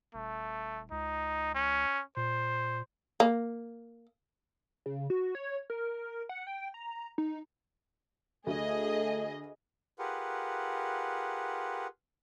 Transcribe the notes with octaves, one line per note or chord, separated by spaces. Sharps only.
D#1 A3
C#2 D#4
C#4
A#2 C5
A#3
C#3
F#4
C#5
A#4
F#5
G5
A#5
D#4
D2 A3 G#4 D#5
F4 G4 G#4 A#4 B4 F#5